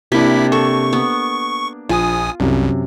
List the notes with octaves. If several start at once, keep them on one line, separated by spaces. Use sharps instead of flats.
C3 A#3 D4 E4 B6
A4 C#6
B3
A#1 F4 G#5 D#6
C2 F#2 C3